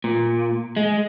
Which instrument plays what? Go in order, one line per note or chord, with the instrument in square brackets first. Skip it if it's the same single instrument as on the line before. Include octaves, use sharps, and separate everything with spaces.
[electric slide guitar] A#2
G#3